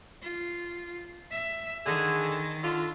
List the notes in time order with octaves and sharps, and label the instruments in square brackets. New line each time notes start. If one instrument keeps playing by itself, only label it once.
[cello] F4
E5
[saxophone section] D3 G#4 [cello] D#3
[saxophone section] D3 F4